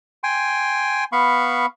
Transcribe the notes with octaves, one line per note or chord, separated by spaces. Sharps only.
G5 G#5 C6
B3 F5 B5 C#6